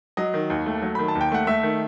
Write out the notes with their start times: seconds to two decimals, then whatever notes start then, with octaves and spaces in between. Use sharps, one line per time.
0.17 F#3 D#5
0.34 D#3
0.50 D#2
0.66 A3
0.82 F#3
0.95 D#3 B5
1.08 A5
1.15 D#2
1.21 G5
1.32 A3 F#5
1.47 A3 E5
1.63 D#3